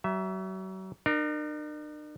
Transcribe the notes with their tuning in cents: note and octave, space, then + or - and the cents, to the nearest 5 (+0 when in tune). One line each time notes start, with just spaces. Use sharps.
F#3 +40 E5 +0
D4 +45 A#4 +0